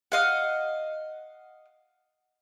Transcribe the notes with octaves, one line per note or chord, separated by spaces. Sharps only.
D#5 F5 F#5